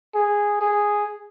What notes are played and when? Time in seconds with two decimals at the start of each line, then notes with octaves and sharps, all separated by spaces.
0.15 G#4
0.61 G#4